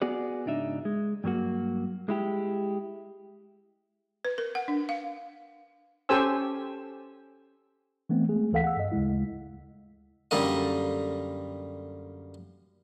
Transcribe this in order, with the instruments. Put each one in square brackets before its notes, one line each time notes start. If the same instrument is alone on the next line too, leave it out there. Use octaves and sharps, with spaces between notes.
[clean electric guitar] B3 F#4 G#4 D5
C#2 G#2 D4 D#4 E5
G#3
G2 F#3 A#3 F#4
G#3 E4 G4
[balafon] B4
A#4
F#5
D4
F5
[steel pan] C#4 G4 A4 C5 G#5 E6
[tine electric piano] E3 A3 B3 C4
G#3 A3 G#4
D2 E3 A4 F5 F#5 B6
F#5 E6
G2 D#5
D2 C#3 G#3 E4
[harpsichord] F#2 D3 G3 A#3 A4 D#5